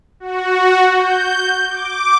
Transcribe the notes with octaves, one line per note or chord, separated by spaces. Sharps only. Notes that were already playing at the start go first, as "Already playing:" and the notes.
F#4
G6
D6